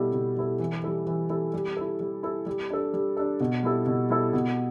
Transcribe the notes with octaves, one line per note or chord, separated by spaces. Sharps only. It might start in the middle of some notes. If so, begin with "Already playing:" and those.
Already playing: B2 G3 E4 A4
B2
G3 E4 A4
E3
G3 E4 A4
E3
G3 E4 A4
G3
E4 A4
G3
E4 A4
G3
D4 A4
G3
D4 A4
B2
G3 E4 A4
B2
G3 E4 A4
B2